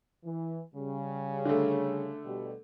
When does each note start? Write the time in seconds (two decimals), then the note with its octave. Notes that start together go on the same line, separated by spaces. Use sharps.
0.24 E3
0.75 C#3 G3
1.45 D3 A3
2.24 B2 G3